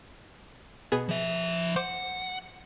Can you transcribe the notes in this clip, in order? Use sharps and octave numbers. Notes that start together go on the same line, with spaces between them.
B2 B3 G#4
F3 E5
C5 F#5 D6